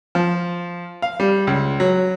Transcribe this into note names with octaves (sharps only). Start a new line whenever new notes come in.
F3
F5
G3
C#2
F#3